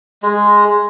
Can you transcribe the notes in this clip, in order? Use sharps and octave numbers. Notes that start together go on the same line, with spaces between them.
G#3